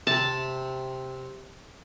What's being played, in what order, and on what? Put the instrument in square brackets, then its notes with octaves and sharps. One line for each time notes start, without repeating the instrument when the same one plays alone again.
[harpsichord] C3 [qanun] A5